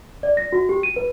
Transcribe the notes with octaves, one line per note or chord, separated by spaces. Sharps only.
D5
A#6
F#4
G4
D#7
B4